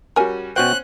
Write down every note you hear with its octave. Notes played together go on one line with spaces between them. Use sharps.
G3 C#4 F#4 A#4 G#5
B2 C#4 F#4 C5 G5 F#6